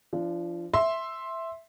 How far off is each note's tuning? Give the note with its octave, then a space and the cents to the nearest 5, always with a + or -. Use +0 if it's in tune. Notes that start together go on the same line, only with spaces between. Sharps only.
F3 -30 D4 +0
E5 +0 C6 +10